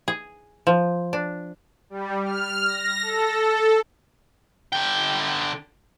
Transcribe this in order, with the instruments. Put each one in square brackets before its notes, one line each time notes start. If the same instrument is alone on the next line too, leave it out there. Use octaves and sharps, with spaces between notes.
[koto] G#4
F3
D4
[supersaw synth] G3
F6
A#6
A4
A4
[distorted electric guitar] D3 G5